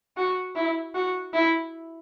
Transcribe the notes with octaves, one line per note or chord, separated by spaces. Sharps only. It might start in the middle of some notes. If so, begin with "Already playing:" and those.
F#4
E4
F#4
E4